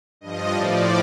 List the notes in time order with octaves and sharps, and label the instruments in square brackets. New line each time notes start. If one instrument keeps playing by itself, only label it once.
[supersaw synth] G2 F3 D#5
A2 F3 D5